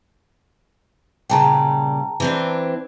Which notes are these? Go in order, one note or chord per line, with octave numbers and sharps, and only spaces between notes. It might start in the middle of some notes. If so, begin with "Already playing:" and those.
A#2 C#3 G3 G5 A5 A#5
E3 C4 D4